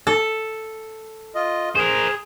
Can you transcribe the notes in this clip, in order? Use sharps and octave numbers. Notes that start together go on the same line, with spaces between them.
A4
F4 D#5
G#4 A#4 C5